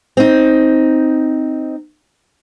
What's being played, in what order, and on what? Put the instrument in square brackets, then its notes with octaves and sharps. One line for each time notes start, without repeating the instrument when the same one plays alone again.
[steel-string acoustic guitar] C4 D#4